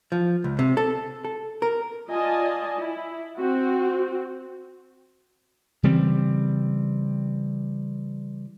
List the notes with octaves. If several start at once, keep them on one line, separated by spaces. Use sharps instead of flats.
F3
C#2
C3
A4
A4
A#4
F4 D5 D#5 G#5 A5
E4
C4 F#4
C#3 E3 G3 C4